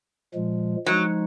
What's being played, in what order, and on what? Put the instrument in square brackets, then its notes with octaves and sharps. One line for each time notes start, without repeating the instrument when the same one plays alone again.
[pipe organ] A#2 F3 G#3
[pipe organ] F3 G#3 D#4 [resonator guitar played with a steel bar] F#3